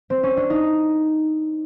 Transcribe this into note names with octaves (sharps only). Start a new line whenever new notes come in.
C4
C#4
D4
D#4